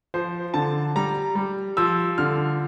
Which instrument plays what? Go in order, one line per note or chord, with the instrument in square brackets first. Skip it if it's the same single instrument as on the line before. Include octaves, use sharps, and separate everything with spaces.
[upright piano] F3 C5
D3 A5
G3 A#5
G3
F3 E6
D3 F6